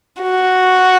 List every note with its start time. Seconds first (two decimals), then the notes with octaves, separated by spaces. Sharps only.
0.22 F#4